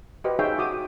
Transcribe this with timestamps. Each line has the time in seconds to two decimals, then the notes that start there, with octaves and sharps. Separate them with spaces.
0.24 F#4 G4 B4 C5 D#5
0.39 D#4 G#4 C#5 E5 F5 G5
0.58 F#4 D6 D#6